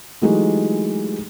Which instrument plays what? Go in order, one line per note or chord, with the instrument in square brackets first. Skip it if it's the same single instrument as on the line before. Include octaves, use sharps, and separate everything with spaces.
[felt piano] E3 F#3 G#3 A3 D#4 G4